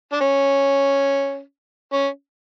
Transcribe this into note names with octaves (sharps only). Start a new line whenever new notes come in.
D4
C#4
C#4